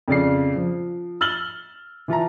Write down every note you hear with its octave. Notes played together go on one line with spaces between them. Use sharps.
F2 C#3 D5 C7
F3
E6 F6 A6 F#7 G7
E3 F4 A5 A#5